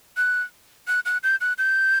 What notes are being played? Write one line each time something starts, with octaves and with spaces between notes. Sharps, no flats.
F#6
F#6
F#6
G6
F#6
G6